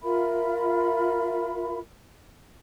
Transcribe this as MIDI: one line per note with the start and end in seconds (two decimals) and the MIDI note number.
0.02 1.79 65
0.02 1.79 70
0.02 1.79 76
0.02 1.79 83